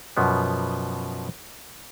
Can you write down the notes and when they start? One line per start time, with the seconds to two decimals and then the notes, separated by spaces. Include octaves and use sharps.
0.17 F#2 B2 F3 B3